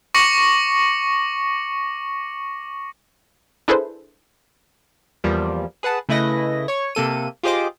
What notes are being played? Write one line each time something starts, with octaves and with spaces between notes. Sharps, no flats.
C#6 D6 A#6 C#7 F#7
D4 E4 G#4 A4 B4 C5
E2 F3 G3 A#3
G#4 B4 F#5 A5
C#3 A3 E4 B4 D#5 A#6
C#5 C#6
C3 A#3 A4 D#7
F4 G4 G#4 C5 D#5 D6